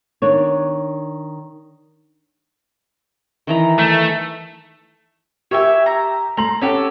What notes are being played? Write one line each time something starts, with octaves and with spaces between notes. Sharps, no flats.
D#3 D4 C#5
D#3 E3 A#5
A3
G4 A#4 C#5 E5 G5 G#5
A#5
A3 A#5 C6 F#7
C#4 F#4 G4 A4